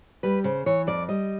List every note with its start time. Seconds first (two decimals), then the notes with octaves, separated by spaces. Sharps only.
0.23 G3 B4
0.44 C#3 C5
0.66 E3 C#5
0.87 F2 D5
1.09 G3 D#5